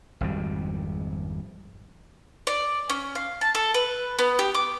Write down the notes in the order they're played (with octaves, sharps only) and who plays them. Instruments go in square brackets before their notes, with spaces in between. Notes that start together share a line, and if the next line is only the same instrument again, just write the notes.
[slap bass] G#1 F2 G3
[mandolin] D5
C#4
F5
A5
A4
B4
B3
G4
D6